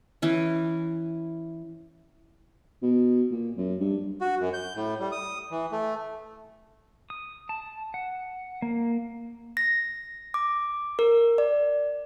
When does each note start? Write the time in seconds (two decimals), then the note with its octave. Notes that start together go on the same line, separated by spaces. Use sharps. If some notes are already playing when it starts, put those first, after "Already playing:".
0.22 E3 C#4
2.83 B2
3.31 A#2
3.57 F#2
3.80 G2
4.21 F#4
4.40 F#2
4.53 G6
4.75 A2
5.00 G3
5.12 D#6
5.51 E3
5.72 A3
7.10 D#6
7.49 A5
7.94 F#5
8.62 A#3
9.57 A#6
10.34 D6
10.99 A#4
11.38 D5